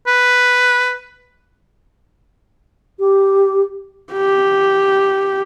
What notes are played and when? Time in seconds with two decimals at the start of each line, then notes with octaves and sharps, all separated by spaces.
0.07 B4
2.99 G4
4.13 G4